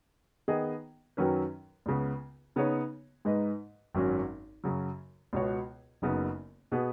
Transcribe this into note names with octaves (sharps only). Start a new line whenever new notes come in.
D#3 B3 G#4 D#5
F#2 D#3 F#3 C#4 B4
C#2 C#3 B3
C#3 B3 D#4 G#4 C#5
G#2 G#3 D#4 B4 D#5
G#1 F#2 F#3 C#4 F#4
F#2 C#3 F#3
C#2 B2 B3 F#4 C#5
F#1 F#2 C#3 B3 D#4
B2 B3 G#4 B4